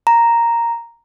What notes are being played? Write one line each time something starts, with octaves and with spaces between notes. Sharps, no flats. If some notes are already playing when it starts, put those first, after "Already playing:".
A#5